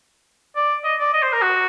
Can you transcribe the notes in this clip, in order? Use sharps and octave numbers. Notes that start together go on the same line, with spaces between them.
D5
D#5
D5
D#5
C5
A#4
F#4